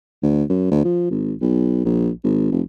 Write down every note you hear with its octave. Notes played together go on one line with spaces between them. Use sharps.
D2
F#2
D2
F3
G#1
B1
A#1
G#1
F1